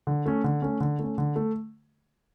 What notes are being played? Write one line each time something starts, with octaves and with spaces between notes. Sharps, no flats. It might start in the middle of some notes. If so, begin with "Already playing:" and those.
D3
A3 C#4
D3
A3 C#4
D3
A3 C#4
D3
A3